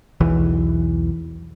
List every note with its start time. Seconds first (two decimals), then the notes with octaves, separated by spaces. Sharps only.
0.20 B1 E2 E3